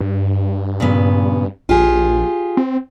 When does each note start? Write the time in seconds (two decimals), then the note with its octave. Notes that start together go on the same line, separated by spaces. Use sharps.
0.01 G2
0.80 A#2 C#3 B3
1.69 A#1 F4 G4 G#4
2.57 C4